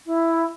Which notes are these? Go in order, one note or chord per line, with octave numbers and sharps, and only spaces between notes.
E4